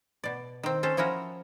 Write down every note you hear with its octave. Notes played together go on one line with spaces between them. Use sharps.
B2 D5
D#3 C4
C#4 A4 C5
F3 C#4 E4 F#4 A#4